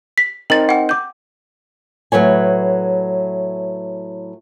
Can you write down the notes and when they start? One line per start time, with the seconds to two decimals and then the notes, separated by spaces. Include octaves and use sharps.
0.18 B6
0.50 C4 D#4 A#4 A6 F#7
0.69 F#5 G5
0.89 D6 G6
2.12 A2 F#3 B4 C#5 G#5